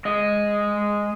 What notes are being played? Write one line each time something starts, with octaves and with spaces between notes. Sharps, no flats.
G#3 D#5